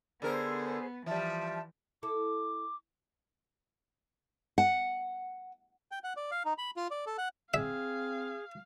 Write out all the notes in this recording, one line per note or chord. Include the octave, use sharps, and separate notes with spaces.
D3 B3 G#4 A#4 C5
E3 F3 G3 E5 A5
E4 A4 D6
F#5
G5
F#5
D5
F5
D#4
B5
F4
D5
A4
F#5
C4 G#4 E5 F5